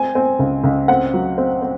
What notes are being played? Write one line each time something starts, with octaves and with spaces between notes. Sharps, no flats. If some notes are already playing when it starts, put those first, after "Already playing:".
Already playing: C4 G#5
C4
C#2
C#2
C4 F#5
F#3
C4
C4